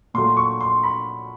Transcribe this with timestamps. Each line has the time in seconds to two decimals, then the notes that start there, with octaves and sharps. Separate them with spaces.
0.14 A#2 F#3 A3 C6
0.37 C#6
0.61 C6
0.83 B5